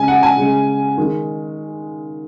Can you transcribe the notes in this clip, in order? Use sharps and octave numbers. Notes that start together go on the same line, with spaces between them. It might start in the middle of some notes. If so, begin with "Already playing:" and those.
Already playing: C#3 G#3 G#5
F#5
G#5
C#3 G#3
D#3 G#3